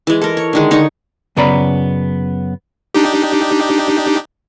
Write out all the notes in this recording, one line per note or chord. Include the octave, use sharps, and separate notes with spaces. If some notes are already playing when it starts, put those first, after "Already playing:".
E3 G#3
A4 A#4
C#5
D3 D#3 G#3
D3 D#4 C#5
F#2 C#3 B3 D5 A#5 B5
D4 D#4 G4